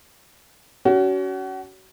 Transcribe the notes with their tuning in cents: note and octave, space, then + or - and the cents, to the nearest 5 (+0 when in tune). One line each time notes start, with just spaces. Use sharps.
C#4 +30 F#4 +30